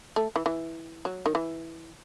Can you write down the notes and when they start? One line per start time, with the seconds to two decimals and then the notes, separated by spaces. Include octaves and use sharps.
0.16 A3
0.36 E3
0.46 E3
1.05 F#3
1.26 D#3
1.35 E3